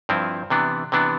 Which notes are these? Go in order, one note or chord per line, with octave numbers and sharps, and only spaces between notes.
G2 F3 C4 E4
C3 E3 B3 D4
C3 E3 B3 D4